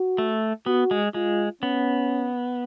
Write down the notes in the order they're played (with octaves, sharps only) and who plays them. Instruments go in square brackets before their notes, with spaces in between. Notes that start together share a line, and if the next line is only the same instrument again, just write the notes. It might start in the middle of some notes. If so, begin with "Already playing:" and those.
Already playing: [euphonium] F#4
[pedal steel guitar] A3
[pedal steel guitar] B3 [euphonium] F#4
[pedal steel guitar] G#3
[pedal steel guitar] G#3 [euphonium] F4
[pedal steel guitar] B3 [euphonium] C#4